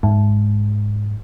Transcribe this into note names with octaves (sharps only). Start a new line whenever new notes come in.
G#2